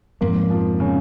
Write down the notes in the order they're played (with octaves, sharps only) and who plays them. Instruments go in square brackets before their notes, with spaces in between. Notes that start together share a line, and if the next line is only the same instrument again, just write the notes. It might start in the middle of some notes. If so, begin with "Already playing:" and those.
[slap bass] F2 G#2 [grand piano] A#3
[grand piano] F3
C#3